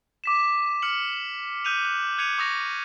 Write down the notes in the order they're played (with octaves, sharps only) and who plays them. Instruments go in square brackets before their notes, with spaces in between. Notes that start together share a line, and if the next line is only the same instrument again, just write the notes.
[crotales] D6 B6 E7
F6 C#7 F#7
D#6 F#6 G6 D#7 F7
F#6
F#6 G#6 C#7 D#7 F7
C#6 D#6 A#6 F7